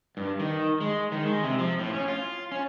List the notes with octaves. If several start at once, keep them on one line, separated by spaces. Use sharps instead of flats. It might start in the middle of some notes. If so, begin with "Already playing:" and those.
G2
D#3
G#3
D#3
G#3
C3
F3
A2
C#4
F4
C#4